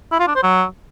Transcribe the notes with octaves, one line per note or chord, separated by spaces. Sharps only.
E4
F4
D4
C5
F#3